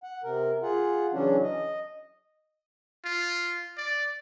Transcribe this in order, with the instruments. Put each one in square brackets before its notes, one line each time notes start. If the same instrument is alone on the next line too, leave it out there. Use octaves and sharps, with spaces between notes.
[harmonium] F#5
C3 A#4
F4 G#4 F#5
C#3 E3 F#3 C#4 D4
D#5
[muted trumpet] F4
D5